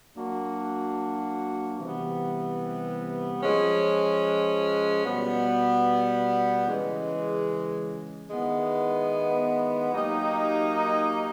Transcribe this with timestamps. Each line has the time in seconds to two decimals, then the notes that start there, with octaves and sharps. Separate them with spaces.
0.16 F#3 A#3 D4 F#4
1.78 C3 E3 G3 B3
3.41 F3 G#3 C#4
5.03 B2 G3 B3
6.66 C#3 E3 G#3
8.28 D#3 G#3 B3 E4
9.91 F#3 A#3 D#4 G4